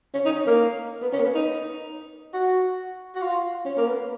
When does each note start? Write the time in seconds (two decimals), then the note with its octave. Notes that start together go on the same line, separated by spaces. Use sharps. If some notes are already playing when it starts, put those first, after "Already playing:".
0.14 C#4
0.25 D#4
0.36 C#4
0.47 A#3
1.02 B3
1.13 C#4
1.20 A#3
1.24 B3
1.35 D#4
2.34 F#4
3.15 F#4
3.21 F4
3.65 C#4
3.77 A#3
3.87 B3